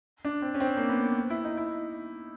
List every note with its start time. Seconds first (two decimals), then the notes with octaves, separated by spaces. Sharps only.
0.25 D4
0.42 C4
0.55 C#4
0.60 C4
0.77 A#3
0.89 B3
1.30 E4
1.44 D#4
1.57 E4